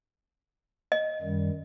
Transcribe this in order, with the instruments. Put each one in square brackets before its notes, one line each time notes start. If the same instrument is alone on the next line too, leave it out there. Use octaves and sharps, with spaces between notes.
[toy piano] D#5
[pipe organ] F#2 D#3 G3